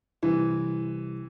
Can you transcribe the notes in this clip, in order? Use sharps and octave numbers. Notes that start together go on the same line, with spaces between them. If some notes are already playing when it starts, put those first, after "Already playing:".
C2 E3